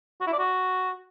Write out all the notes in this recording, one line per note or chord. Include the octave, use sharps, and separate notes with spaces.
F#4
E4
D5
F#4